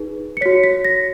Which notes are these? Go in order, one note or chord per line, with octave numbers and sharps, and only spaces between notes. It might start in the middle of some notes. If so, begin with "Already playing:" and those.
Already playing: D#4 G#4 B4
C#7
F#4 C#5 B6
B6
A#6